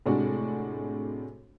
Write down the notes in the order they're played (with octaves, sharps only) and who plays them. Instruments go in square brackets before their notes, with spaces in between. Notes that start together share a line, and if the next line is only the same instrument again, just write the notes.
[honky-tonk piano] A2 C3 G#3 D4 F#4